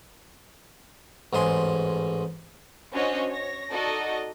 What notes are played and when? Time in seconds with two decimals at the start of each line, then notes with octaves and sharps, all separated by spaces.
1.33 A1 G#2 G#4 C6
2.92 C#4 D4 F#4 C5 C#5 D#5
3.30 C#5 A#6
3.70 D#4 F#4 A4 D5 D#5